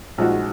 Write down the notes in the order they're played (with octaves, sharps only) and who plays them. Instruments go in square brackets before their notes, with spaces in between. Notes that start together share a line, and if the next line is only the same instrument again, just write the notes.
[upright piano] A#1 A#2 G#3 D#4 F#4